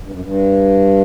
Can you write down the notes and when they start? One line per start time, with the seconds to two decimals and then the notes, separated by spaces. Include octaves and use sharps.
0.03 G2
0.12 F#2
0.21 G2